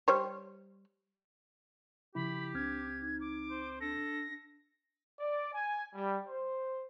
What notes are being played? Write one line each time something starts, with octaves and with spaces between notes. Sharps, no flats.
G3 C5 C#5
C#3 F3 E4 G4 B5
C#2 C4 D4 F6 G#6
D#4
D6
C5
D4 A4 A#6
D5
G#5
G3
C5